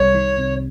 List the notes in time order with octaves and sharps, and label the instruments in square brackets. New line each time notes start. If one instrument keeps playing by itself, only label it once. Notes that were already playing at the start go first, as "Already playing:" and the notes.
Already playing: [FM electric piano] C2 C3 G3 [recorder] C#5
[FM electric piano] D#3
C3